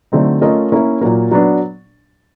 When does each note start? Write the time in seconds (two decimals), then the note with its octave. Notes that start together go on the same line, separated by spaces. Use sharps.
0.12 D3 F#3 A3 C4 D#4
0.41 A3 C#4 F4 A#4 D#5
0.72 A#3 C#4 E4
1.01 A#2 F#3 A#3
1.31 F#3 B3 D4